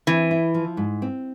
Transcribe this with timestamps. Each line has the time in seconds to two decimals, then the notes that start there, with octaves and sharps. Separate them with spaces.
0.07 E3 C4
0.31 E4
0.54 F3
0.77 G#2
1.02 C4